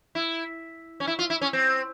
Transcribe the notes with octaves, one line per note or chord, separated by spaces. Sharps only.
E4
C#4
E4
F4
E4
C#4
C4